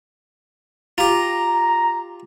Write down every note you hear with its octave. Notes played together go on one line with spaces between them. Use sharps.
F4 G4 A#5